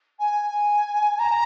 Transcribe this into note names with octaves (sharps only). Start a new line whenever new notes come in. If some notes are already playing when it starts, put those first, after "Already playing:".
G#5
A#5